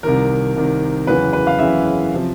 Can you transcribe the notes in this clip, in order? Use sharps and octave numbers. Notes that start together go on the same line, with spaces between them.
C2 C3 D#3 A#4
C2 C3 D#3
F#1 E2 C#3 E3 B4
B4
F5
F#1 E2 C#3 E3 E5
C3 F3